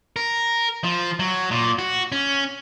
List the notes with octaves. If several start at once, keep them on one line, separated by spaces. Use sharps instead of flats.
A#4
F3
F#3
A#2
F#4
C#4